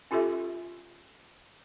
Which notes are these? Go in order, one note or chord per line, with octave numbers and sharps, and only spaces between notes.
C#4 F4 G4 A4 E5